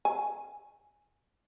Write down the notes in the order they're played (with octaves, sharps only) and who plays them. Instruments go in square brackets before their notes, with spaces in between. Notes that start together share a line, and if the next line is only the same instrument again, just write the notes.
[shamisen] G#5